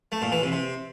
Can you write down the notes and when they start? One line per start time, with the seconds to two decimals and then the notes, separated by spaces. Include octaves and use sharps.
0.12 A3
0.22 A#2
0.32 E3
0.42 C3
0.52 C3